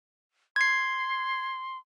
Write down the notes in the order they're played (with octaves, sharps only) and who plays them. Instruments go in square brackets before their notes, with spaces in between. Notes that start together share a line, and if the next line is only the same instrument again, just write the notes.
[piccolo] C6 [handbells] G#6 C7